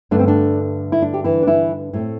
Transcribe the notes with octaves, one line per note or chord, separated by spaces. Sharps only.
G2 D3 A3 D4
C4
D4
E4
D4
G4
E3 E4
D4
E3 E4
A2 A3 C4